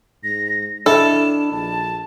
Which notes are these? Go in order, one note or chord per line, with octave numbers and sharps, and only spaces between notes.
G#2 A#6
D#3 D4 E4 A4 E7
A#1 A5